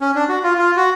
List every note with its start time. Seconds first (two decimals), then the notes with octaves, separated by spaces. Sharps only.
0.01 C#4
0.15 D4
0.29 F#4
0.43 F4
0.58 F4
0.76 F#4